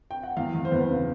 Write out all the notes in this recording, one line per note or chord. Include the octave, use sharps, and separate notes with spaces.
G5
F#5
E2 F5
E2
C5
E2 B4
C#3